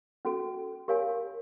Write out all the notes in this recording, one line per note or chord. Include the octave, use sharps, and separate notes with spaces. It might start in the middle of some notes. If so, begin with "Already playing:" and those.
C#4 F#4 A4
G4 A#4 C#5 F5 G#5